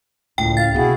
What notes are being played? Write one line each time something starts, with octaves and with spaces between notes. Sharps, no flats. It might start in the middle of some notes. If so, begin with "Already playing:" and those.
C#2 A2 G5
F5 A6
B2 B3 E4 F#4 G#4